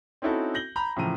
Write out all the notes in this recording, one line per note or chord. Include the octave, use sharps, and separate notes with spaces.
C4 C#4 D#4 E4 F#4 A4
G6 A#6 F#7 G7
A#5 B5 G6
A2 C#3 E3 F3 A#5 D#7